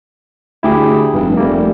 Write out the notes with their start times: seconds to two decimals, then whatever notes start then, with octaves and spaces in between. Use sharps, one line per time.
0.63 D2 E4 G4 G#4
1.14 F1 G2
1.37 F1 G3 A3 A#3